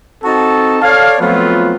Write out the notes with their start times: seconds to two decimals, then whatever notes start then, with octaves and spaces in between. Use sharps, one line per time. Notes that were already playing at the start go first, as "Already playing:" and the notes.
0.23 C4 D#4 F#4 A4 A5
0.82 A4 C#5 D5 F5
1.19 F3 F#3 A3 B3 C4 F4